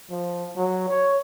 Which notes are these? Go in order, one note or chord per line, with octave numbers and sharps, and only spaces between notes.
F3
F#3
C#5